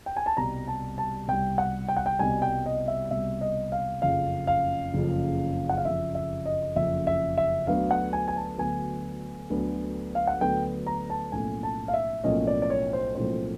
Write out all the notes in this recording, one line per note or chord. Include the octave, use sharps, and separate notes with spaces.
G5
G#5
A5
C2 B2 G3 A#5
A5
A5
C2 B2 G3 G5
F#5
G5
F#5
G5
C2 B2 G3 G#5
G5
D#5
E5
C2 B2 G3 E5
D#5
F5
F#1 F2 C#3 F3 F5
F5
F#1 F2 C#3 F3
F#5
F5
F#1 F2 C#3 F3 E5
E5
D#5
F#1 F2 C#3 F3 E5
E5
E5
D2 D3 F#3 B3 F5
F#5
G#5
G#5
A5
D2 D3 F#3 B3 G#5
D2 D3 F#3 B3
F5
F#5
D2 D3 F#3 B3 G5
A#5
A5
B1 A2 F3 A#3 C#4 G#5
A5
F5
E5
B1 A2 F3 A#3 C#4 D#5
D5
D5
C#5
C5
B1 A2 F3 A#3 C#4 C5